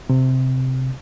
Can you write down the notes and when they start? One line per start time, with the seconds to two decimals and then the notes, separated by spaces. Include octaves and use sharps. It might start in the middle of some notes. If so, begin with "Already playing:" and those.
0.10 C3